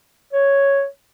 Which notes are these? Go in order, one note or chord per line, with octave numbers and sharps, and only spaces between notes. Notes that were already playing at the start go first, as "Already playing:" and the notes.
C#5